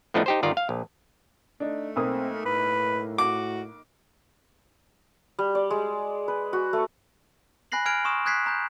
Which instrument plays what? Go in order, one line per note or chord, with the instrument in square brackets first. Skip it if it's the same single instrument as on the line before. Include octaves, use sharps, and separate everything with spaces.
[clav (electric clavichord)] A2 F3 A3 B3 D4 D#4
D#4 G4 C5
G1 D#3 F4 D5 A#5
F5
A#1
[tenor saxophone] A3 [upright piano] D4 D#4
[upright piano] B1 A#3 D#6 [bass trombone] C4
[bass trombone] A2 [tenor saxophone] B4
[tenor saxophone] F#4 [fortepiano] D6
[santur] G3
D5
G#3
B4
F#4
A3
[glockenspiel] G#5 B5 F#6 A#6 C7 F#7
G#5 F6 G#6 D7 F7
C6 C#6 D#6 E7
D#6 F#6 G#6 B6 C7
A#5 G6